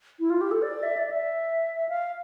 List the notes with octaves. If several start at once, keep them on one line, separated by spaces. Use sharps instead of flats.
E4
F4
G4
A4
D5
E5
D5
E5
F5